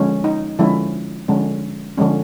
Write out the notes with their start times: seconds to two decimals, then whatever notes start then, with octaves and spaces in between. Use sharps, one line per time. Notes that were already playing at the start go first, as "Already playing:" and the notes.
Already playing: D3 F3 G#3 C#4
0.24 D#4
0.59 D3 F3 G#3 C#4 E4
1.28 D3 F3 G#3 C#4
1.97 D3 F3 G#3 C#4